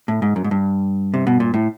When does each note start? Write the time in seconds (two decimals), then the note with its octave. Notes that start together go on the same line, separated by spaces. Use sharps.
0.08 A2
0.22 G#2
0.36 F#2
0.44 G#2
0.51 G2
1.14 C3
1.27 B2
1.40 A#2
1.54 A2